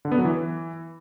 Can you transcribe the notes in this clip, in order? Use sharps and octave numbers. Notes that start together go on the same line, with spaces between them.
D3
B3
F#3
E3